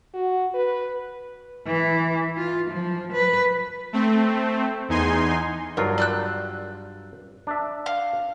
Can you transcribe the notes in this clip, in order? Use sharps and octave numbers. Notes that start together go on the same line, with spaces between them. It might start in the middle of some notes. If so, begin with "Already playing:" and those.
F#4
B4
E3
F4
F3
B4
A3 C4
E2 D#4 G#5 C6
G2 F#3 F4 A#4
D5 E6 F#6
D4 E5
F5